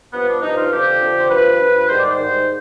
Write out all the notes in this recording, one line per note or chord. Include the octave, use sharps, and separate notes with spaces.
G2 F3 B3
D4
G2 F3 D#4
F4
F2 D3 F3 G4
F2 D3 F3
C5
G2 F3 B4
G2 F3
G#2 D#3 G3 C5
D5
C5
G#2 D#3 G3